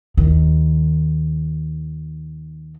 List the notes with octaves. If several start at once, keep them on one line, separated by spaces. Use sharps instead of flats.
D#2 D#3